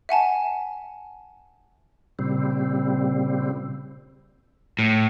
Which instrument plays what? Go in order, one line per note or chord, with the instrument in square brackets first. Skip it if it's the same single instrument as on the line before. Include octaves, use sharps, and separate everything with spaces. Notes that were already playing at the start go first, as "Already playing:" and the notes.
[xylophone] E5 F#5 G#5 A5
[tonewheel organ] A#2 C#3 G3 C4
[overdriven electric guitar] A2